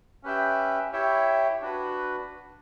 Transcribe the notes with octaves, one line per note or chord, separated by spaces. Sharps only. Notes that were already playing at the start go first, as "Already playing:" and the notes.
C#4 G4 B4 E5 G5
E4 G4 C#5 E5 G5
D4 F#4 B4